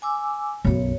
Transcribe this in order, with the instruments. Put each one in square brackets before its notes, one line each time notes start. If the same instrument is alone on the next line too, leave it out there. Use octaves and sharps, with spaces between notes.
[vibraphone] G#5 D6 E6
[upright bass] B1 F#2 [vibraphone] C#5